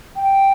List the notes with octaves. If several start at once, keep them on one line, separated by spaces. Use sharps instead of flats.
G5